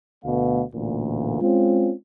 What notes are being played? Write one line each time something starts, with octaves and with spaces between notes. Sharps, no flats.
D2 B2 A3 B3 F5
A1 D2 A#2
G#3 C4 C#4 F4